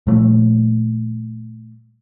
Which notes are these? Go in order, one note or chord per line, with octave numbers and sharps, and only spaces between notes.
A#2 F3 G3 A3